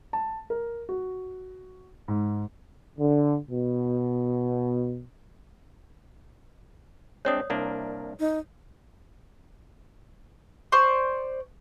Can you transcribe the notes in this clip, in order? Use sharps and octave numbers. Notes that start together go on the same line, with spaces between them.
A5
A#4
F#4
G#2
D3
B2
G#3 C4 D4 C#5 D5 D#6
C2 A#3 D4
D#4
C5 D5 C#6